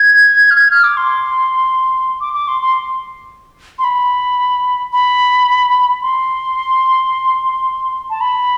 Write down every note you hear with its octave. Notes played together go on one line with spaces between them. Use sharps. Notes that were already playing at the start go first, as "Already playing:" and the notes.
Already playing: G#6
F6
G#6
F6
D6
C6
D6
D6
C6
C6
C6
B5
B5
C6
A5
B5